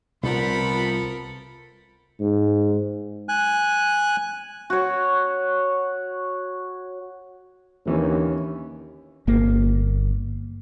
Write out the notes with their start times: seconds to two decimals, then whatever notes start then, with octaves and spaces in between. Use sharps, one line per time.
0.23 C2 F3 B3 F4 A4 A#4 B5
2.20 G#2
3.29 G#5 F#6
4.70 F#4 C#5
7.86 D#2 D3 E3 C#4
9.27 G1 A#3